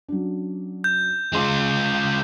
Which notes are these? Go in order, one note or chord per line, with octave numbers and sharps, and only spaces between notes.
F#3 C#4 D4
G6
C#3 G#3 F4 C6 D6